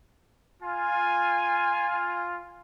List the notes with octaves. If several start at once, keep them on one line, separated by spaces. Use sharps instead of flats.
F4 G#5